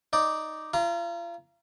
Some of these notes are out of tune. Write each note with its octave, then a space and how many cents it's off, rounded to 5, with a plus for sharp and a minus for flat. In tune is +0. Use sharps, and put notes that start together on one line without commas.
D#4 +0 D5 +0
F4 -35 A#5 +0